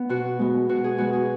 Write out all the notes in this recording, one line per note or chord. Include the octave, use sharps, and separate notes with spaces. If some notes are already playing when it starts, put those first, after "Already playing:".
Already playing: B3
B2 F#4
G#3 B3
B2 F#4
G#4
G#3 B3 F#4
G#4